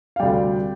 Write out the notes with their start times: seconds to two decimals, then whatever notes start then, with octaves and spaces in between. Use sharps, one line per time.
0.16 F5
0.20 D2 C3 G3 D5 G5